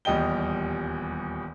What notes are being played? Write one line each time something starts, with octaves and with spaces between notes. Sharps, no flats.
D#1 E2 G3 D#5 G5 G7